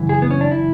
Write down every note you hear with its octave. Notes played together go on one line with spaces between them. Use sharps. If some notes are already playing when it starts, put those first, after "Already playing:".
Already playing: F#2 C#3 E3
G#4
B3
C#4
D4
E4